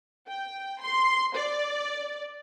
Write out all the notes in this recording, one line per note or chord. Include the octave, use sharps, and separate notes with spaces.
G5
C6
D5